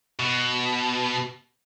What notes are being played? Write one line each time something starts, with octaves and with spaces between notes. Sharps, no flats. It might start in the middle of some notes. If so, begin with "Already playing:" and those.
B2